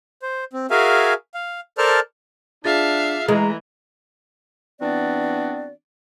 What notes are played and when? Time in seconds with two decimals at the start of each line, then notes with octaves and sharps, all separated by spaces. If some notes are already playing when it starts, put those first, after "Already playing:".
0.22 C5
0.53 C4
0.70 F#4 G#4 A#4 E5 F5 G#5
1.34 F5
1.78 A4 A#4 C5 D5 A5 F6
2.65 D4 F4 G#4 E5 F5 A6
3.28 E3 G#3 A#5
4.80 E3 B3 C4 D4 F#4 D5